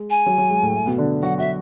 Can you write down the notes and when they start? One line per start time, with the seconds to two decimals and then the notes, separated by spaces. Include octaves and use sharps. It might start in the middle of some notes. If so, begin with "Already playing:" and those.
Already playing: G#3
0.10 G#5
0.26 F#3
0.38 F#3
0.50 G#3
0.63 A2 A3
0.74 A2 A3
0.86 B2 B3
0.98 D3 D4
1.23 F#3 F#4 F#5
1.38 F#4 E5